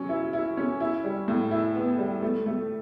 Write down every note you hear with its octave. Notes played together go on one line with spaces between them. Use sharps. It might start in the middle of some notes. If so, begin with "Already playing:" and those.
Already playing: F#3 C#4
E4
E4
C#4
E4
G3
A2
E4
B3
G3
A3
A3